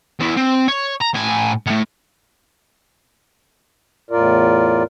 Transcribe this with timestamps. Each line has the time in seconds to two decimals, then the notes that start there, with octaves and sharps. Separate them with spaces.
0.20 E2 E4
0.37 C4
0.68 C#5
1.01 A#5
1.14 A2 G#5
1.66 A2 A3
4.11 E2 A2 F4 A#4 D5